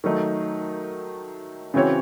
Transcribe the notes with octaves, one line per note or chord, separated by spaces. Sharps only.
D#3 F#3 A3 D#4
C#3 E3 C4 F#4 C#5